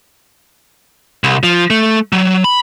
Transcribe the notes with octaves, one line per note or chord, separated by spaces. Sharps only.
C2
F3
A3
F#3
B5